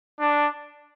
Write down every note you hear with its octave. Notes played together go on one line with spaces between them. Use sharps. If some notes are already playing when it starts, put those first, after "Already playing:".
D4